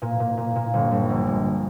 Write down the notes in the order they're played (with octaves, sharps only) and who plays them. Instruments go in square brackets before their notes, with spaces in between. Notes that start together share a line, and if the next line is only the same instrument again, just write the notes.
[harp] A#2
A#2
A#2
A#2
G1
G1
A#1
G#3